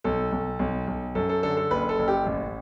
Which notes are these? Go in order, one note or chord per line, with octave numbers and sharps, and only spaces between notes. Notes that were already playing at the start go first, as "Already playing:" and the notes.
B1 A4
B1
B1
B1
F#2 A4
A4
D3 A4
A4
F#1 B4
A4
F#1
G4
A1